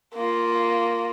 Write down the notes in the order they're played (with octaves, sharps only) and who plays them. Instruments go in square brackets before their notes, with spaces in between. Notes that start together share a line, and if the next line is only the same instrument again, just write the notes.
[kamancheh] A#3 F4